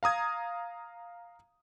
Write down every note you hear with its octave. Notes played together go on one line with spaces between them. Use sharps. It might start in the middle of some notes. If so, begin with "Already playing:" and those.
F5 A#5 D#6 G#6